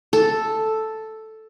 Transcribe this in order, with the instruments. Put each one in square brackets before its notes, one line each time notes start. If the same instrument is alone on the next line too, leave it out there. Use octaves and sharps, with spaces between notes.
[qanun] A4